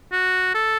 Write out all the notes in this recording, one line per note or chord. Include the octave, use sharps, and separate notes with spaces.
F#4
A4